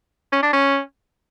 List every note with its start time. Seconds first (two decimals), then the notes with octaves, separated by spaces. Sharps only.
0.33 C#4
0.43 D4
0.53 C#4